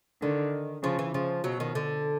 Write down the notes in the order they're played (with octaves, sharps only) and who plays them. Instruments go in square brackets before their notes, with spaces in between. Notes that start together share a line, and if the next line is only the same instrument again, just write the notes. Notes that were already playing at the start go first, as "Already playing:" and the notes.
[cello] D3 [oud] D#3
[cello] C#3 [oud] F3
[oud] E3
[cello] C#3 [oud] F3
[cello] B2 [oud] F#3
[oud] D#3
D3